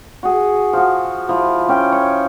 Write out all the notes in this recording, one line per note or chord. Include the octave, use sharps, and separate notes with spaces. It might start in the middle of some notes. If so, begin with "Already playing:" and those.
F#4 G#4
F3 F#4
F3 E4
C#4 G5
C#5